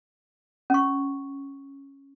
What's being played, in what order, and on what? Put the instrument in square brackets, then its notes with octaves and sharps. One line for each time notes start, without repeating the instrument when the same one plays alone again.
[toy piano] C#4 C#6